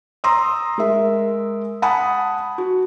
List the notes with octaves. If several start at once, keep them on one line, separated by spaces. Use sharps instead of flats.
A#5 C6 D#6 E6
G#3 A#4 E5
F#5 G#5 A5 B5 D#6
F#4